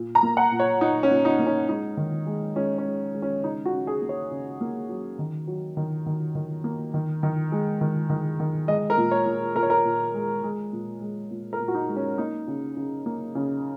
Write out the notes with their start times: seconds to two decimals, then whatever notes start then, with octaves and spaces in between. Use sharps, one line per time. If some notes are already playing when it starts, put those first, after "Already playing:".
Already playing: A#2
0.15 A#5
0.23 A#3
0.37 F#5
0.52 A#2
0.60 C#5
0.81 A#2 D#4
1.03 C#4
1.11 A#2
1.25 D#4
1.39 A#3
1.47 C#4
1.69 G#3 D#4
1.97 D#3
2.26 G#3
2.56 G#3 C#4
2.78 C#4
2.85 G#3
3.14 G#3
3.22 C#4
3.43 C#3 D#4
3.66 F#4
3.73 C#3
3.87 G#4
4.02 A#3
4.09 C#5
4.31 C#3
4.61 A#3
4.89 F#3
5.19 D#3
5.48 F#3
5.77 D#3
6.06 D#3
6.35 D#3
6.64 A#3
6.94 D#3
7.23 D#3
7.52 G#3
7.81 D#3
8.10 D#3
8.40 D#3
8.68 G#3 D#5
8.90 A#4
8.98 A#2
9.11 C#5
9.26 A#2
9.55 A#2 A#4
9.63 C#5
9.70 A#4
9.85 A#2
10.14 G#3
10.44 G#3
10.73 A#2
11.01 G#3
11.31 A#2
11.53 A#4
11.60 A#2
11.68 F#4
11.75 D#4
11.89 G#3
11.96 C#4
12.18 A#3 D#4
12.47 C#3
12.77 C#3
13.06 A#3
13.35 C#3